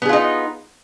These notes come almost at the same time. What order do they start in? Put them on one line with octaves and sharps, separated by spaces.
B3 G#4 F4 D#4